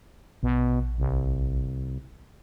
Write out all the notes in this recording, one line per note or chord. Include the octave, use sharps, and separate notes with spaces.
A#1 B2
C2